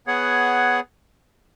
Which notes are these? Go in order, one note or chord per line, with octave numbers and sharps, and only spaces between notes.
B3 G#4 C#5 F#5